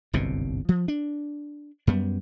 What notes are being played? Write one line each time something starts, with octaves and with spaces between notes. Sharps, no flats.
G1 C2 F#2 B2
F3
D4
F#2 G3 B3